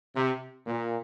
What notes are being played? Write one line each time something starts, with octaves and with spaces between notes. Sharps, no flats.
C3
A#2